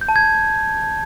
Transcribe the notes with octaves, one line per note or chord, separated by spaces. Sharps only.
G6
A5
G#6